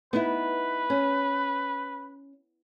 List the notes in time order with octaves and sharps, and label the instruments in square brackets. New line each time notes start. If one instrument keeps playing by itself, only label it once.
[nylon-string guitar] B3 D#4 E4 [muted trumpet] B4
[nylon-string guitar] C#4